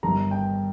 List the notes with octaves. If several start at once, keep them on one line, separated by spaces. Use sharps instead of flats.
G1 G2 D#3 A#5
G5